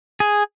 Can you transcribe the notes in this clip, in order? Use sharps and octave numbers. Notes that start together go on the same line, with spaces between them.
G#4